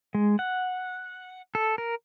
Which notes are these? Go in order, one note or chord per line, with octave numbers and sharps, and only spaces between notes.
G#3
F#5
A4
A#4